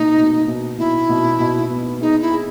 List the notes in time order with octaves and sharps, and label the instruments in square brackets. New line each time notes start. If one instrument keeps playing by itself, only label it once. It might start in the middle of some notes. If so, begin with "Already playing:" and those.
Already playing: [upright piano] B2 A#3 [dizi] D#4
[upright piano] B2
B2
[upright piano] B2 [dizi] E4
[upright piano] B2
B2
B3
[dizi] D#4 [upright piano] G#4
[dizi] E4
[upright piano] G#4